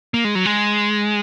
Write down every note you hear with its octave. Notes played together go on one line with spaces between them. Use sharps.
A#3
G#3
F#3
G#3